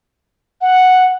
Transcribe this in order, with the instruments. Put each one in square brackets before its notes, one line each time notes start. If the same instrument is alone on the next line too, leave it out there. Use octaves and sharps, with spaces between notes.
[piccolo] F#5